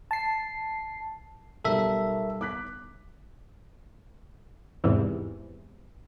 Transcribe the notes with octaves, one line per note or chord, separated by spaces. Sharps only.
A5 C7
B1 G3 A4 A#4 E5
D6 F#6 B6
E2 G#2 C3 E3